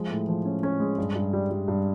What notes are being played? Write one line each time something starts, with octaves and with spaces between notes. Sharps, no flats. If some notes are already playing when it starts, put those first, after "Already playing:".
Already playing: F3 G#3
A2
F3
C#4
C#4
G#3
G2
G2
G3
G3
G2